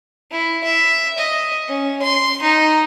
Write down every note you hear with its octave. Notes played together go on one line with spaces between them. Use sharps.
E4
E5
D#5
C#4
C6
D#4